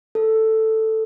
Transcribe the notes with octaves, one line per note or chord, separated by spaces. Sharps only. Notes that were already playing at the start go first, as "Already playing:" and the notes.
A4